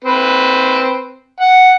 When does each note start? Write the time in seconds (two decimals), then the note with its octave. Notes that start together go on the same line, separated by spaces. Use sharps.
0.04 C4 B4
1.41 F#5